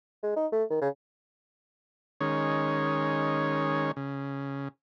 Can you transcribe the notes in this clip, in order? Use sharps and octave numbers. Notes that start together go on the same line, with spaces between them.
G#3
D#4
A3
D#3
C#3
D#3 G#3 C#4 C#5
C#3